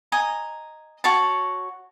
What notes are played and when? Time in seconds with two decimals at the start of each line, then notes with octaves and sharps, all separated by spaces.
0.12 D#5 G#5 A#5
1.04 F#4 C#5 A5